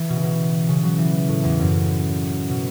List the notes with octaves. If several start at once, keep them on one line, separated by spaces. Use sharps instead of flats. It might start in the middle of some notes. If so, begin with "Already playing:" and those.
Already playing: E3
B2
C#3
B2
C#3
F#3
E3
A2
E2
F#2
B2